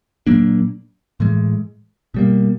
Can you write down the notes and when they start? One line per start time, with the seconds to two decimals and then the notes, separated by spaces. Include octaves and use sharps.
0.27 A#2 F#3 A#3 D4
1.20 A2 E3 G#3
2.14 B2 G3 A#3